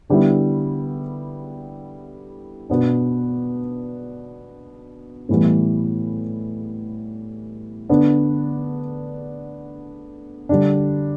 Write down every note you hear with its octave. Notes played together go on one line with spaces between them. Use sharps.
D3 G3 B3 E4
B2 B3 D4
A2 E3 G3 B3
D3 B3 D4
D3 G3 D4